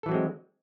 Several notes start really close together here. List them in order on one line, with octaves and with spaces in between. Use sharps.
A4 E3 F#3 C4 G#3